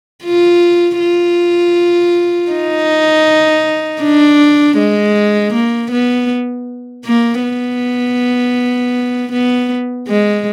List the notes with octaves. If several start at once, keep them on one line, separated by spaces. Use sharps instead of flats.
F4
F4
D#4
D4
G#3
A#3
B3
A#3
B3
B3
G#3